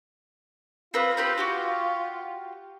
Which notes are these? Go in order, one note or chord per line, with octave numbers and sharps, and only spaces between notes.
C4 F4 B4 D#6
C4 G4 B4
F#4 G4 D6